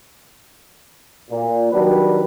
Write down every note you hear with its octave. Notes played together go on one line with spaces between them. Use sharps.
A#2
D#3 F#3 G3 D4 B4